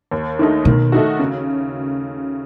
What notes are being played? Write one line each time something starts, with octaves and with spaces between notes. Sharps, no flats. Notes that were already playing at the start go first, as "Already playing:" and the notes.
D#2
D#3 A3 D#4
B2 D#3
A3 D#4 F#4
C#3